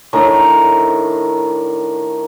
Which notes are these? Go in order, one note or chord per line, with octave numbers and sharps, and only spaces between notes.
A2 D#3 D4 A#5